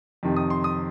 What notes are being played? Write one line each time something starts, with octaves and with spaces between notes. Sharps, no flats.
F2 C3 D#3
D#6
C6
D#6